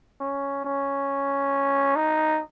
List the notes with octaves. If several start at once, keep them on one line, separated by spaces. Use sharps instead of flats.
C#4
C#4
D#4